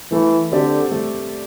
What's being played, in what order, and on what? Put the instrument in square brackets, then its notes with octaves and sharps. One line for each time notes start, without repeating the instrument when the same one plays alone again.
[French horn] E3 [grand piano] A3
[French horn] D3 [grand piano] C4 G4 D5
[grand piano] A3